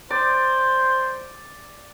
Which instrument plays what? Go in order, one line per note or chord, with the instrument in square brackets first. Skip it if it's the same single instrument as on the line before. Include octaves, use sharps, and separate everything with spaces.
[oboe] C5 [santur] D5